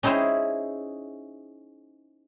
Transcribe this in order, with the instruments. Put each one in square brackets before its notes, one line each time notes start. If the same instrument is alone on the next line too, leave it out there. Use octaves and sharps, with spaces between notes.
[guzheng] C#4 D#4 E4 G#4 C5